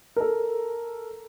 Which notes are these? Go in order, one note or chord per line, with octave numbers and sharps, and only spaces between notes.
A4 A#4